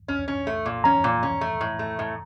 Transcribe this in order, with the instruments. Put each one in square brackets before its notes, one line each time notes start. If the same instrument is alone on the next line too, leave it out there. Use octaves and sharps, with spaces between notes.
[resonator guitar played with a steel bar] C#4
C#4
A3
A#2
[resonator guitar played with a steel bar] C#4 [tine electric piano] A#5
[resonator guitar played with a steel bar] A#2
C#4
A3
A2
A3
A2